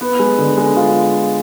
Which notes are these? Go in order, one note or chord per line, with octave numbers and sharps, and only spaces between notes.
B3
G#3
D3
G#3
F4